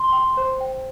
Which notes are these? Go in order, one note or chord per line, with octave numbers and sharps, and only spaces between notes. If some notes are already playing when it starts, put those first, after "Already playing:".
Already playing: C6
G5
C5
G5